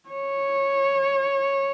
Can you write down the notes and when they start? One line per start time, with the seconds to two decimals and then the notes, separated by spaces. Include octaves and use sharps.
0.10 C#5